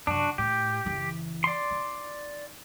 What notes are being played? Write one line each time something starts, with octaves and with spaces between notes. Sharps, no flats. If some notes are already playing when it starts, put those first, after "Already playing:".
F#2 C3 D4 F#4
A2 G4
F#1 E3
D5 C6
D#3